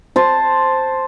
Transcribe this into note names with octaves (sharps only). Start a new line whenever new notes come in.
C5 A5